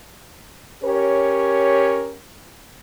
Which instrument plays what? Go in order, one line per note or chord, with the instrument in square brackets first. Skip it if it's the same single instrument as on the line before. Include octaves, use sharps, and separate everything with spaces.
[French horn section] C#4 G4 A#4 C#5